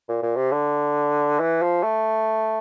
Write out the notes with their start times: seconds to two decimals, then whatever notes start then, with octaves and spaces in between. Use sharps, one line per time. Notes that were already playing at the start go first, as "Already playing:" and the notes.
0.09 A#2
0.23 A#2
0.37 C3
0.52 D3
1.40 E3
1.62 F3
1.83 A3